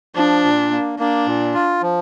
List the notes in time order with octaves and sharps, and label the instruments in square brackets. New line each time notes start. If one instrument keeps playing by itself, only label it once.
[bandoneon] F3 [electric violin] D4
[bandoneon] A#2
A#3
[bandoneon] A#3 [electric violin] D4
[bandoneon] A#2
F4
F3